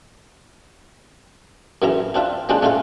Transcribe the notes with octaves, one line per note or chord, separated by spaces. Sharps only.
F#2 C#3 E3 E5 A#5
C4 D4 F4 E5
F3 G3 G#3 C#4 D4 F4
G#3 A3 C#4 F4 F5